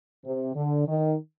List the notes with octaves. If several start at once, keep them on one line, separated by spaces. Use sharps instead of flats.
C3
D3
D#3